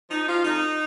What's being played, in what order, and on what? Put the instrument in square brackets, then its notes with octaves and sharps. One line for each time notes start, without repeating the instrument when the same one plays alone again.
[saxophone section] F3 D#4
F3 F4
F2 D#4